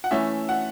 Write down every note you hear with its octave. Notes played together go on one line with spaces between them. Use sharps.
F#5
E3 A3 C#4 E5
F#5